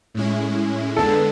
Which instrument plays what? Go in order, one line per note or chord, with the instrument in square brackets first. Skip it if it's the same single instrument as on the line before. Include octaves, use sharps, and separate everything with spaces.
[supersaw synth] A2 G#3 C#4 E4
[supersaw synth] D3 G#3 B3 D4 [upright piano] A4